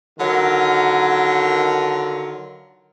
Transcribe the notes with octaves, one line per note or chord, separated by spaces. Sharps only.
D3 D#3 F#3 F4 A#4